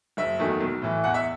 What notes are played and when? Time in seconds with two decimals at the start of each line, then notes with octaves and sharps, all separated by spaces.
0.17 F#1 E5
0.39 E2 D#3 F#3 A3
0.61 B1
0.82 A2 E3
1.04 E2 F#5
1.14 E5